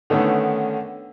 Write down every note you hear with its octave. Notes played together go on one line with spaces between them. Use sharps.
D3 D#3 A3 B3 C#4